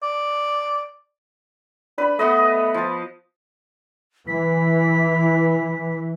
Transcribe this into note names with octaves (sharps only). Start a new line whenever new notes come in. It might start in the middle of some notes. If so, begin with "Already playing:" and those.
D5
D4 B4 B5
A3 B3 B4 D#5
F3 A5
E3 B6